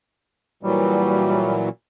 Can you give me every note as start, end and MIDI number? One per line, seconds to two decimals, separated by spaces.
0.63 1.69 46
0.63 1.69 52
0.63 1.69 54
0.63 1.62 55